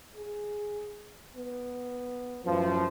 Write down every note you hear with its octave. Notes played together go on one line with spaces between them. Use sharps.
G#4
B3
F#2 A2 F3 B4